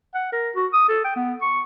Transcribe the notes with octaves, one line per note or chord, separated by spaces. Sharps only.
F#5
A#4
F#4
D#6
A4
G5
B3
C#6